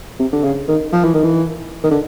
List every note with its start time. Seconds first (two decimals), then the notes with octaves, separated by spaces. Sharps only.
0.19 C3
0.33 D3
0.43 C#3
0.68 D#3
0.92 F3
1.04 E3
1.14 D#3
1.24 E3
1.84 D#3
1.91 D3